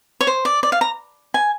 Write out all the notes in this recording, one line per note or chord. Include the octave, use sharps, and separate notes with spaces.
C#5
C5
D5
D5
F5
A#5
G#5